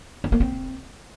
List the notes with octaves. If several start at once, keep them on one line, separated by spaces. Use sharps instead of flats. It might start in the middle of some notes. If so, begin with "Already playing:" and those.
C4
A#3
C4